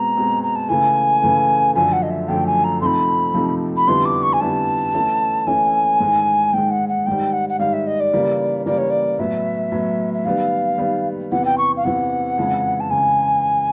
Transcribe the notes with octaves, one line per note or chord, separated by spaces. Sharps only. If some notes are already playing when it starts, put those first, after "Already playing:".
Already playing: B2 G#3 C4 A#5
B2 G#3 C4
A#5
A5
C#3 E3 A3 G#5
C#3 E3 A3
F#2 D3 F3 A3 G#5
F#5
D#5
E5
F#2 D3 F3 A3 G5
G#5
A#5
C3 F3 A3 C4 D#4 B5 C6
C3 F3 A3 C4 D#4
B5
F2 D3 G3 B3 E4 C6
D6
C#6
G#5
F2 D3 G3 B3 E4 A5
E3 A3 C#4 E4
E3 A3 C#4 E4 G#5
G#2 D#3 G#3
G#2 D#3 G#3 G5
F#5
F#5
G#2 D#3 G3 G5
F#5
F#5
G#2 D#3 G3 F5
E5
D#5
D5
C#3 E3 G3 A#3
C#3 E3 G3 A#3 D5
C#5
D5
A2 F#3 B3 E5
A2 F#3 B3
E5
D#3 G3 B3 F5
D#3 G3 B3
E2 C3 E3 F#5
G5
C#6
F5
E2 C3 E3 F#5
F2 C#3 E3 G#3
A5
C#3 G#5